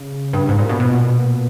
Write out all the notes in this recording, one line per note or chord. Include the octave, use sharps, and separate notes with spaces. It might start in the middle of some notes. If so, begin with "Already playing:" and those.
Already playing: C#3
G2
G#2
A#2
B2
B2